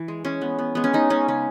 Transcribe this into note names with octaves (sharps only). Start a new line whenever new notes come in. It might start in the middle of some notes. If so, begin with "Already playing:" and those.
Already playing: E3
G#3
G#3 C#4
B3
B3
G#3 B3
C#4
B3 D#4
G#3 C#4
C#3 C#4